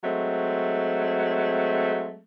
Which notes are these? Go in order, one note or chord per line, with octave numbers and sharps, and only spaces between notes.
F#3 G#3 A3 C4